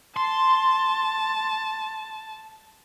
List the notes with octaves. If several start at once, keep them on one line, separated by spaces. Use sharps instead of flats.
A5 C6